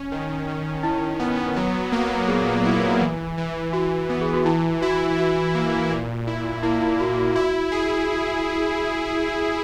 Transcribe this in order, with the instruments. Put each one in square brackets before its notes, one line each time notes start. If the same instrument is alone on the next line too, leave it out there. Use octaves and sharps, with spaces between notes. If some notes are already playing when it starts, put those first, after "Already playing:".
Already playing: [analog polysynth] C#4
D#3
D#3
[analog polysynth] D#3 [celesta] E4
[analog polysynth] B3
F#3
A#3
[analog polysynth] A#2 [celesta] G#4
[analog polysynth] E4
E3
E3
[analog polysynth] E3 [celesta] F#4
[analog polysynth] B3
[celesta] G#4
F#4
[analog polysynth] E3 [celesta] E4
[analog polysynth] E4 [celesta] F#4
[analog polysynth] E3 [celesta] F#4
[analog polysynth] A#3
A#2
E4
[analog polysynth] A#3 [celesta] E4
[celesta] E4
[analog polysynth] A#3 [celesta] F#4
[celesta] F#4
[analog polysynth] E4 [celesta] F#4
[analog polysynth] G#4